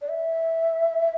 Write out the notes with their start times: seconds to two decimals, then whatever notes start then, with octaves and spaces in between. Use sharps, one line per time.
0.01 D5
0.09 E5